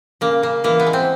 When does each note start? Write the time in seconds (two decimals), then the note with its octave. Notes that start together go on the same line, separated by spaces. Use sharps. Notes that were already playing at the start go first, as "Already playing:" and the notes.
0.21 C#3 A#3
0.43 C#3 A#3
0.64 E3 A#3
0.79 B3
0.87 G#3
0.93 C4